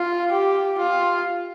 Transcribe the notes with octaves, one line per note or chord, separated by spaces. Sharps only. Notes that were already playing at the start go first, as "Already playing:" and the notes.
Already playing: F4
G4
F4